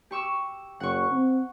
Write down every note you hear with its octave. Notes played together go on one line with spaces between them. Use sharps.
G4 C#6 E6
F#1 F#5 C#6
C4